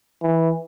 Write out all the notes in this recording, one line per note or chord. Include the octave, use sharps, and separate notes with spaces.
E3